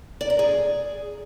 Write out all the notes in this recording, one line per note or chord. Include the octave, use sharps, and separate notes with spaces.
D5
A#4
G#4